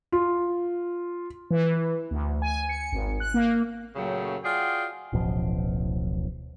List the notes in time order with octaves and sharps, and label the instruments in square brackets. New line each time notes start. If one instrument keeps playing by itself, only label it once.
[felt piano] F4
[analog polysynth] E3
D2
G#5
C#7
G#1
F#6
A#3
[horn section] F#2 A#2 C#3 F#3 A3 G5
F4 F#4 G#4 D5 F#5 G5
[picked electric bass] D1 A1 B2 F3